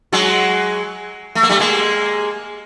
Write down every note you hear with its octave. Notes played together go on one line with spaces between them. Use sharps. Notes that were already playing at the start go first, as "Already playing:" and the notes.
F#3 G#3
A3
A#3
G3 A3
G#3 A#3